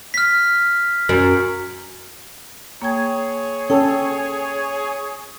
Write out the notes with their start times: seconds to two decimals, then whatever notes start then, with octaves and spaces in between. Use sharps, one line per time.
0.14 F6 B6
1.09 F#2
2.82 A#3 G#4 C#5 G5 G#6
3.70 C#4 A4 G5